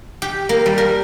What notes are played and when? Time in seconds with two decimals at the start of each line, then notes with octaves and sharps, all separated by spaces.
0.22 G4
0.49 A#3
0.66 G3
0.78 A#4